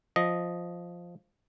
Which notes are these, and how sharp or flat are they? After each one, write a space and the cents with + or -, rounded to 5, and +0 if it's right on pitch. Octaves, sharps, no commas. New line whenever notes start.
F3 +0 D#5 +0